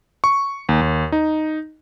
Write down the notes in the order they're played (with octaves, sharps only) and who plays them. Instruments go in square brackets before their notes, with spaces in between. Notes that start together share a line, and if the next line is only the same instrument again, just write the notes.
[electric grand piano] C#6
D#2
D#2
D#4